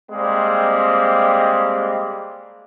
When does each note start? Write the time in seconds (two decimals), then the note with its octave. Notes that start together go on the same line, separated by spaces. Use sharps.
0.11 G3 G#3 A#3 C4